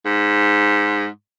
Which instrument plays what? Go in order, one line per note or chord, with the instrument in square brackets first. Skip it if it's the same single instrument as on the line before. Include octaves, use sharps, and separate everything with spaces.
[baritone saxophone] G#2